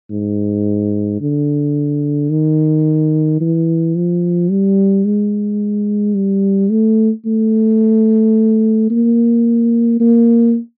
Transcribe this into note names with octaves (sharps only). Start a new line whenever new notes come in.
G#2
D3
D#3
E3
F3
G3
G#3
G3
A3
A3
A#3
A#3